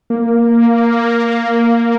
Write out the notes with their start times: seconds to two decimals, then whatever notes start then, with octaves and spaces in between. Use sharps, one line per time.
0.10 A#3